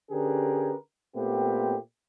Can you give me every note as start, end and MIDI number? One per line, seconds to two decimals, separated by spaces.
0.11 0.75 50
0.11 0.75 61
0.11 0.75 67
0.11 0.75 68
0.11 0.75 70
0.11 0.75 71
1.16 1.77 46
1.16 1.77 57
1.16 1.77 59
1.16 1.77 60
1.16 1.77 67